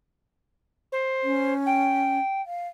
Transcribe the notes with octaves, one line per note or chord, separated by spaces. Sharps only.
C5
C#4
G5
F5